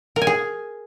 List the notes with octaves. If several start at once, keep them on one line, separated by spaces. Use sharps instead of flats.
A#4
G#5
G#4